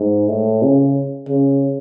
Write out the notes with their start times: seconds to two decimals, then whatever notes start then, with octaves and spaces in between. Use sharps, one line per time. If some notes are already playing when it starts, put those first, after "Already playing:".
Already playing: G#2
0.28 A2
0.62 C#3
1.29 C#3